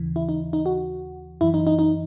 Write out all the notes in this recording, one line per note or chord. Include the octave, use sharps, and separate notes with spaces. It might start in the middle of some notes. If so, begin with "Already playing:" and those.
Already playing: D#2 C#3 E3
E4
D#4
D#4
F#4
F#2 E3 E4
D#4
D#4
D#4